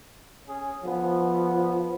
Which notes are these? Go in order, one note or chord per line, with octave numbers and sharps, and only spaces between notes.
C#4 G#4
B2 D3 F3 B3